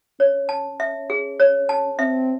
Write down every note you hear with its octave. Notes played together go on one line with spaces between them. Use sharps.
C#4 C#5
A5
E5
G#4
C#5
A5
C4 E5